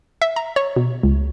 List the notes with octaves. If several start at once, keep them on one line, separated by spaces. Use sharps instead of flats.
E5
A#5
C#5
B2
C#2